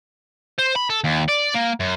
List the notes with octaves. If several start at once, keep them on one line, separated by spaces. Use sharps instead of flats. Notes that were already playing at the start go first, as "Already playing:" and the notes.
C5
B5
A4
D#2
D5
A#3
F#2